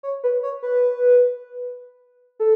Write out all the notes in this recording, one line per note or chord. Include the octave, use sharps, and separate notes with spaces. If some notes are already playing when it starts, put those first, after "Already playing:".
C#5
B4
C#5
B4
A4